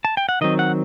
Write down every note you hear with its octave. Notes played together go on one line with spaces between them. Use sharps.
A5
G5
F#5
D#3 F#3 C4 D#5
F#5